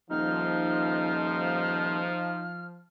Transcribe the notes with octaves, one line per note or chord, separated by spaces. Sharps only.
D#1 F3 D#4 F6